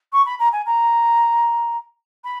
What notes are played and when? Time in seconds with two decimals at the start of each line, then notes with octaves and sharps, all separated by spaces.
0.13 C#6
0.26 B5
0.39 A#5
0.52 G#5
0.66 A#5
2.24 B5